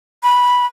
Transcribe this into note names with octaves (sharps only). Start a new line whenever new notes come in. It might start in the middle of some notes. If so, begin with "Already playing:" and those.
B5